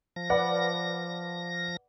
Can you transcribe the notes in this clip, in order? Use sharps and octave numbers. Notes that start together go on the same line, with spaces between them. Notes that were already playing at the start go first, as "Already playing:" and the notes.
F3 A#6
B4 D5 F#5